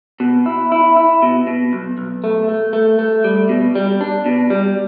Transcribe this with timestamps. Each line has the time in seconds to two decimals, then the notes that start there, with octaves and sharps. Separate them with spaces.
0.20 B2
0.46 E4
0.72 E4
0.97 E4
1.22 B2
1.47 B2
1.73 B1
1.98 B1
2.24 A3
2.49 A3
2.73 A3
2.99 A3
3.24 G3
3.49 B2
3.75 G3
4.01 D4
4.26 B2
4.50 G3